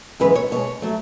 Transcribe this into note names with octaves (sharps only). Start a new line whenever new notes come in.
F#2 E3 G#3 B4
C#5
B2 G#3 C#5
F#3 A3